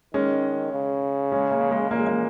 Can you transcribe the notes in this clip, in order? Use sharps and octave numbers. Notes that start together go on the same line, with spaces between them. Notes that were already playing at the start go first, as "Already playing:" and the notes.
D#3 G#3 C#4
C#3
G#3 C#4
A#3
G#3
A#2 A#3
G#3
A#3